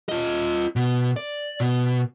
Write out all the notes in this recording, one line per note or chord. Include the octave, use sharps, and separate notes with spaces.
F4 D#5
B2
D5
B2